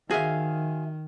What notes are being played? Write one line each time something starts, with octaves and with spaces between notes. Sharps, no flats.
D#3 F#4 G#4 C5 E5 F5